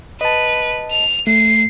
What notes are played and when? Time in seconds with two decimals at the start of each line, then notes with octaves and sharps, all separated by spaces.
0.21 B4 D#5 A5
0.91 F7
1.27 A3 C7